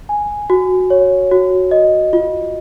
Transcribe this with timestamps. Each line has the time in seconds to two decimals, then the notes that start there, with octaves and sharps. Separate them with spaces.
0.09 G#5
0.50 F#4
0.90 C#5
1.31 F#4
1.71 D#5
2.13 F4